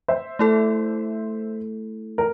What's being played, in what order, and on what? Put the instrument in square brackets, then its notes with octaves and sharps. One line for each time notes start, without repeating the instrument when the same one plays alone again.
[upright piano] C5 E5
[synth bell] A3 E4 A4
[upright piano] A#4